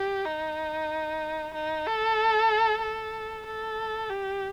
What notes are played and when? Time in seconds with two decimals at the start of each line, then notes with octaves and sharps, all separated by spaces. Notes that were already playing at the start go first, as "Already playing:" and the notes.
Already playing: G4
0.25 D#4
1.54 D#4
1.87 A4
2.82 A4
3.46 A4
4.10 G4